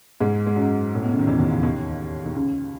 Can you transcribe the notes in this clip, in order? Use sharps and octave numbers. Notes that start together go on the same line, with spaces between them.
G#2 G#3
G#3
F#2 F#3
A2
B2
C#3
D#3
E2 E3
D#2 D#3
C#2 C#3
D#2 D#3
D#3
C#2 C#3